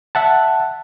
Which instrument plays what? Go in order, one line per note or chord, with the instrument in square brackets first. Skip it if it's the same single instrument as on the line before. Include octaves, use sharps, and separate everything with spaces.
[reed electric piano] E5 F#5 A5